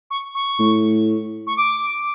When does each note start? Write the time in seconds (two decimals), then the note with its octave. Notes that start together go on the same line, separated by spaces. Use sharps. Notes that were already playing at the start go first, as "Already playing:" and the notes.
0.11 C#6
0.35 C#6
0.60 A2
1.47 C#6
1.57 D6